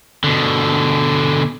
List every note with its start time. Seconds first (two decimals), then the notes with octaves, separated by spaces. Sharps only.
0.24 B2 D3